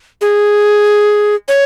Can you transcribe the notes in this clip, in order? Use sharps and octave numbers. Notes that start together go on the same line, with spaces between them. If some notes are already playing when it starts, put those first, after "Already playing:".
G#4
C#5